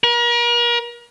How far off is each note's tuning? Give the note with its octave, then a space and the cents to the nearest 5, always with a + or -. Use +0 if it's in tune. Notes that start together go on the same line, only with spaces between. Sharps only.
A#4 +40